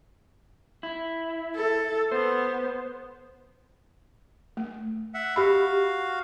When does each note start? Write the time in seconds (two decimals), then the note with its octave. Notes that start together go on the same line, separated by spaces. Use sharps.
0.83 E4
1.56 A4
2.11 B3 C5
4.57 A3
5.14 E5 F#5
5.36 F#4 G4 F5 B5